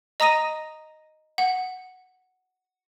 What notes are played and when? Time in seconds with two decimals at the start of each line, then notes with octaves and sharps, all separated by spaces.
0.20 D#5 A#5 D#6 A#6 D#7
1.38 F#5